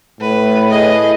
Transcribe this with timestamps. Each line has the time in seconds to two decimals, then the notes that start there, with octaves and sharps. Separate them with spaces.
0.21 A2 B4
0.70 G#4 B4 D#5